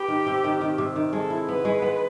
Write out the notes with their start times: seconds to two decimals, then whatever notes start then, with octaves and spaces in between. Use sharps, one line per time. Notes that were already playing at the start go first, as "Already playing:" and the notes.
Already playing: B3 G4
0.08 D#3
0.27 C3
0.44 D#3
0.61 D#3
0.78 C3
0.96 D#3
1.13 G#3 A4
1.30 E4
1.48 B3 B4
1.65 G#3
1.82 B3